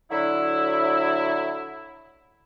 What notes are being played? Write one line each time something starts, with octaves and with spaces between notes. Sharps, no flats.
D3 F#3 E4